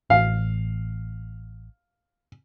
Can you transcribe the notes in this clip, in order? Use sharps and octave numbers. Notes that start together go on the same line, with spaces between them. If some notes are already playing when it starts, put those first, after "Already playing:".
A1 F5